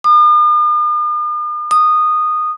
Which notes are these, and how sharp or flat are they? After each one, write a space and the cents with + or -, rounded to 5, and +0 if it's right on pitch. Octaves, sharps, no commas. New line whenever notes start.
D#6 -45
D#6 -15